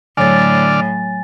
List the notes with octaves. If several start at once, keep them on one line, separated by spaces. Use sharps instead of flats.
A2 D3 F#3 C#5 D5 G#5 F6 A6